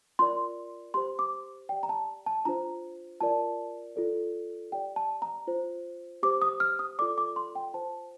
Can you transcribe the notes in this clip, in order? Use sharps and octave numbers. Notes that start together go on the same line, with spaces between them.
F4 A#4 D5 C6
G4 C5 C6
D6
G4 D5 G5
A#5
A5
A5
D4 F4 C5 A#5
F4 A#4 D5 A5
F4 A4 D5
G4 D5 G5
A5
A#5
F4 C5
G4 C5 D6
D#6
F6
D#6
F4 A4 D5 D6
D6
C6
G5
F4 C5 A5